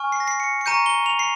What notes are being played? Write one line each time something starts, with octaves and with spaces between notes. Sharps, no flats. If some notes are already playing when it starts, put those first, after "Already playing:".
Already playing: G#5 C#6 F6
C7
A#6
C7
C#7
C#7
A#5 C#6 G6 D#7
G7
F7
C7